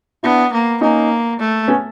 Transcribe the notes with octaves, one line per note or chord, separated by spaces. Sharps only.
B3 D4 E4
A#3
A#3 C#4 D#4
A3
B3 C#4